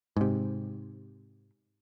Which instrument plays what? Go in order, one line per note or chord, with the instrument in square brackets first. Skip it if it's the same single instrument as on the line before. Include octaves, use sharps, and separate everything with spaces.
[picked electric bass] G#2 C3